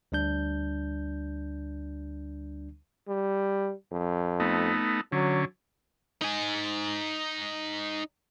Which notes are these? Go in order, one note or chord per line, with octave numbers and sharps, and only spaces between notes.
D2 G3 D4 G6
G3
F2
A3 B3 D#4
D3 F#3 C#4
D#4 G#5